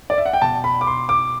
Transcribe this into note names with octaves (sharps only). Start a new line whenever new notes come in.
D5
E5
F#5
G5
B2 A5
B5
D6
C6
D6